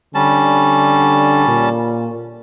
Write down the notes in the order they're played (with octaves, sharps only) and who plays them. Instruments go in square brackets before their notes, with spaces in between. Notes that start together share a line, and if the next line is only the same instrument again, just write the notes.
[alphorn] D3 [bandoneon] G3 C#4 A5
[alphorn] A#2